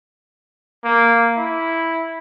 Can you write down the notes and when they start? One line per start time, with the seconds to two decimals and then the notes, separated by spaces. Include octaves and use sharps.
0.85 A#3
1.37 E4